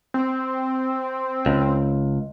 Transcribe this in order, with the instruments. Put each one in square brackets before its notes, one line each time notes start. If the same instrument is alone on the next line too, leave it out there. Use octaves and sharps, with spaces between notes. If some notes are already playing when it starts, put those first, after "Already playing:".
[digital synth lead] C4
[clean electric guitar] C#2